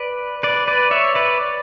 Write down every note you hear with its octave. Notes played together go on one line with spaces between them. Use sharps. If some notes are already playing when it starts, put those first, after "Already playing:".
Already playing: B4 D5
B4 D5
B4 D5
C#5 E5
B4 D5